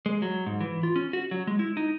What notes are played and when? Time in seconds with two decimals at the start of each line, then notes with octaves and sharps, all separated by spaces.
0.06 G#3
0.22 F#3
0.46 G#2
0.60 E3
0.83 F4
0.96 C#4
1.13 F#4
1.31 F#3
1.47 G#3
1.59 E4
1.77 D#4